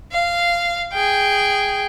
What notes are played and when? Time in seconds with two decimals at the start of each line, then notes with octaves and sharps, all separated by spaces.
0.12 F5
0.93 G#4 G5